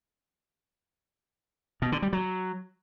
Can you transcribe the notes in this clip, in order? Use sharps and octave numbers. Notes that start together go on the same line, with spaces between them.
B2
D3
G3
F#3